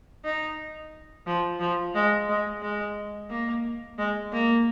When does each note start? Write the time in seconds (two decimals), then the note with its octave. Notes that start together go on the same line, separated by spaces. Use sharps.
0.24 D#4
1.27 F3
1.60 F3
1.94 G#3
2.29 G#3
2.62 G#3
3.30 A#3
3.98 G#3
4.32 A#3